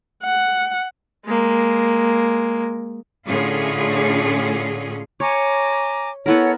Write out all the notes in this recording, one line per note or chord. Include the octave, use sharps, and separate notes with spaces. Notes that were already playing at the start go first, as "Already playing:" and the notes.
F#5
G#3 A#3
A2 D3 A3 C#4 F4 G#4
C#5 G#5 A#5 D6
B3 E4 A4 A#4 C#5 F#5